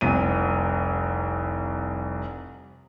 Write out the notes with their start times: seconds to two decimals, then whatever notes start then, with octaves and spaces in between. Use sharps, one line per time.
0.01 F1 C2 D#7